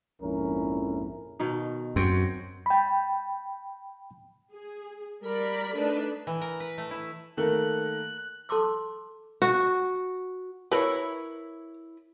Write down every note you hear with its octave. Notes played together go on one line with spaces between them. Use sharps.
A#1 F2 G#2 C#4 E4 A#4
B2 D#3 D#4
F#2 C4 F#4
G5 B5
G#4
G3 A#4 D5 B5
A3 D4 D#4 B4
E3
A#4
B4
A3
E4
D#3 A3 A#3 F#6
A4 A5 C6 D6 E6
F#4
E4 A#4 B4 C#5